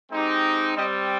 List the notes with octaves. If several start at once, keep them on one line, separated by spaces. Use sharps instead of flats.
G#3 C4 D#4 G4
G3 C4 G4 D#5